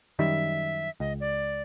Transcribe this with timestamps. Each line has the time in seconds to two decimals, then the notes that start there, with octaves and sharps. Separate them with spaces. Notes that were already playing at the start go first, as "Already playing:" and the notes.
0.19 F#2 D#3 G3 E5
1.00 C#2 D#5
1.20 D5